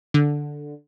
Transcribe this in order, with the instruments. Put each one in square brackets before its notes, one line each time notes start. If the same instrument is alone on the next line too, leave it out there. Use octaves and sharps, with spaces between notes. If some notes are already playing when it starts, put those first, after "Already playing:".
[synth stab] D3